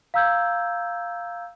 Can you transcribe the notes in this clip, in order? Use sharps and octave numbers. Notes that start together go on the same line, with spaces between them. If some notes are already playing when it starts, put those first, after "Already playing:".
F5 A#5 E6 G6 G#6